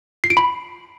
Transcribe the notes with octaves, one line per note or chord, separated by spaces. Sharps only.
C7
D7
B5